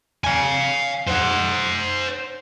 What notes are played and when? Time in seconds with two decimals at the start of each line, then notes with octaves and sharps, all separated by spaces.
0.24 F5 G#5
1.09 C5 F#5